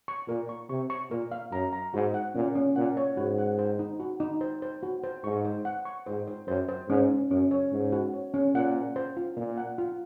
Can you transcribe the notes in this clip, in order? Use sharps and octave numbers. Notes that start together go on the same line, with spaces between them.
C#6
A#2 A#4
C#6
C3 C#6
C#6
A#2 A#4
F5
F#2 A#5
A#5
G#2 F#4
F#5
A#2 C#4
C#4
A#2 F#5
C#5
G#2 F#4
F#5
C5
D#4
F#4
D#4
C5
C5
F#4
C5
G#2 C#6
C5
F#5
C#6
G#2 C5
C5
F#2 C5
C5
G#2 C#4
C#4
F#2 C#4
C#5
G#2 C#4
F#4
C#5
C#4
A#2 F#5
C5
C5
F4
A#2 F4
F#5
F4